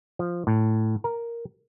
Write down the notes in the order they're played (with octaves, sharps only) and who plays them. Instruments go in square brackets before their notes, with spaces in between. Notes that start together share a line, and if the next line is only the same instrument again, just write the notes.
[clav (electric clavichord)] F3
A2
A#4